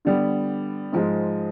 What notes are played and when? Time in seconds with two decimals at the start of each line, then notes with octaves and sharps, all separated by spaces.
0.05 D3 G3 B3
0.93 G#2 F3 G#3